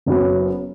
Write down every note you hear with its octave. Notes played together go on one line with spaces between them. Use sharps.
F#1 F#2 F#3 B3